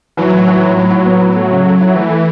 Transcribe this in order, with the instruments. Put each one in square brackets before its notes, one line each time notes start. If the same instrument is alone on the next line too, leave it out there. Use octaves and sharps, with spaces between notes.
[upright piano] E3 [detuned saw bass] F#3
[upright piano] A2
E3
A2
[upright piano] A2 [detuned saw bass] F#3
[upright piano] A2
B3
A2
A3
C#3
A4
E4
[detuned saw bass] E3 [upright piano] A3
[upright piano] A3